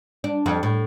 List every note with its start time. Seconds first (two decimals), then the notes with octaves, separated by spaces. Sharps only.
0.24 D4
0.46 F2
0.63 A2